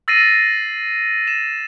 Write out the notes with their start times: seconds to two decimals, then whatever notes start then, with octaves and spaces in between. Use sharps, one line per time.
0.08 E6 A6 A#6 C7 D#7
1.27 E7